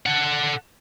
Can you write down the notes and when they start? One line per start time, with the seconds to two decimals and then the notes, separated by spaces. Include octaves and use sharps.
0.06 A4 F#5